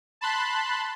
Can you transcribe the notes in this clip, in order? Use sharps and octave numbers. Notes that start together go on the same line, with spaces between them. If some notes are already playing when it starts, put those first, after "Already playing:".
A5 B5 C6 F#6